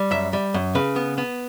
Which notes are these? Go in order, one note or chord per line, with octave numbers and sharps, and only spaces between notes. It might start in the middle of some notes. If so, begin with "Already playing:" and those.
Already playing: G3
F#2 E5
G3
F#2
C#3 B4
B3
B3